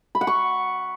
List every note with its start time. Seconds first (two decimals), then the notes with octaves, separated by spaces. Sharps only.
0.15 B5
0.21 F#5
0.27 C#6